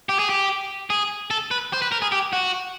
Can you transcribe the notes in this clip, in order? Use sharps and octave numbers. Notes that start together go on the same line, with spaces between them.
G4
G#4
G4
G#4
A4
B4
C5
B4
A#4
G#4
G4
F#4